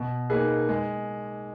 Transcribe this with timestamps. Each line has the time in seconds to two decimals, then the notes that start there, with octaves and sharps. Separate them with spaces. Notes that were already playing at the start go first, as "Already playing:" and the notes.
Already playing: B2
0.30 A#3 D#4 G#4 B4
0.69 G#3